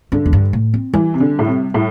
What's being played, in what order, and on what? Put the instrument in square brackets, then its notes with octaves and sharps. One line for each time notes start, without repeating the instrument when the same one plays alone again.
[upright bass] G2 [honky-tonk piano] D3
[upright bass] E2
G2
A2
C4
[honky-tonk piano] E3 [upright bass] G3
[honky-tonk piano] C3
D3
A2
C3
A2